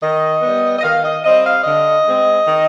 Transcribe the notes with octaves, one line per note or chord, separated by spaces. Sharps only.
D#3 D#5
G3 B3
D#5
D#3 F5
D#5
G3 C4 D#5
F5
D3 D#5
G#3 C4
D#3